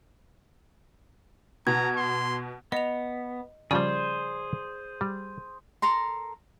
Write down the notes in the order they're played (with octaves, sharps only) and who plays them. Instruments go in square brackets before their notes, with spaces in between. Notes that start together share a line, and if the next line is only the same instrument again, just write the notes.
[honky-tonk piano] B2 [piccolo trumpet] A#5 [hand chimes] G#6
[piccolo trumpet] C6
[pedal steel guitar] B3 [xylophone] D#5 F7
[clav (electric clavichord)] C#3 F3 G3 [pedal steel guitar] G#4 C5 [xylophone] D5
[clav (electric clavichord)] G3
[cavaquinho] A4 A#4 A#5 C6